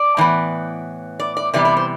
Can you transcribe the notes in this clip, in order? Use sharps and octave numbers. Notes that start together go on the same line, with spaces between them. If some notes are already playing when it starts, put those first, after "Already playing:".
Already playing: D5
A2 E3 B3
D5
D5
C3 E3 G3 B3 D5
D5
C5